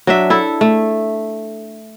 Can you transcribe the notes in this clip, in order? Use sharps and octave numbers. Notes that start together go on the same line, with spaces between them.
F#3 D4 E5
E4 A4
A3